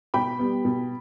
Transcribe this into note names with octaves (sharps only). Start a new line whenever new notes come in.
B2 G5 B5
G3 B3
B2